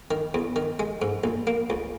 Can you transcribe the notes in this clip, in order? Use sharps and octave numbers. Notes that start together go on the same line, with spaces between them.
D#3
E2
D#3
G#3
G#2
A#1
A#3
C#2